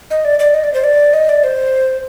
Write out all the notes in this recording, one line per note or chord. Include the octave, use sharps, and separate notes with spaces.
D#5
D5
D5
D#5
D5
C5
D5
D#5
D5
C5